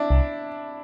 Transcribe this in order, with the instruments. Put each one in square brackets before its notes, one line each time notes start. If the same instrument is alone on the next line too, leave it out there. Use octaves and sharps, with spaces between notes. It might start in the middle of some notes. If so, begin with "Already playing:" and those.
Already playing: [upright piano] D4 E4
[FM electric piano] C2